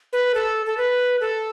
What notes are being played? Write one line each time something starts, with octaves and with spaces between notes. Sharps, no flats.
B4
A4
A4
B4
A4